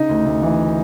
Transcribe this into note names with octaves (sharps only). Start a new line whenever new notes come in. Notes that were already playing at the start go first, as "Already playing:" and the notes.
Already playing: C#3 D#4
D2
D2
E3